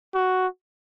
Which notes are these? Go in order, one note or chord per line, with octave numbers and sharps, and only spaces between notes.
F#4